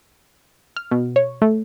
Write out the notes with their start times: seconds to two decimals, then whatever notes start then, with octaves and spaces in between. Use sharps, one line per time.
0.76 F6
0.91 B2
1.16 C#5
1.42 A3